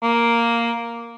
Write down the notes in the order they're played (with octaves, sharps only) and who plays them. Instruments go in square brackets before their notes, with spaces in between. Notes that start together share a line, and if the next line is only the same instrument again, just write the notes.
[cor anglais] A#3